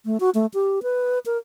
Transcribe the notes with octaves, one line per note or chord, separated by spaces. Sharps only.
A3
F#4
A3
G4
B4
A#4